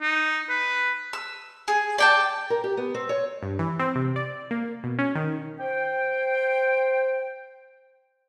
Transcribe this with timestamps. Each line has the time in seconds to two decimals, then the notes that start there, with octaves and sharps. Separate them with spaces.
0.02 D#4
0.50 B4
1.13 E6
1.68 G#4
1.98 D5 G5 A5
2.50 A#4
2.64 G4
2.77 B3
2.94 C4
3.09 C#5
3.43 G2
3.59 E3
3.80 C4
3.95 C3
4.16 D5
4.51 A#3
4.84 B2
4.99 C#4
5.15 D#3
5.60 C5 G5